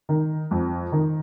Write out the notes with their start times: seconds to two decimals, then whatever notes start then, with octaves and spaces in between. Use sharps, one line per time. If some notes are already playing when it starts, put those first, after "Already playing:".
0.09 D#3
0.51 F2
0.92 D#3